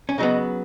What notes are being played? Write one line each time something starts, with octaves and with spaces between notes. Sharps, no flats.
C#4
C#3 F#3 B3 D#4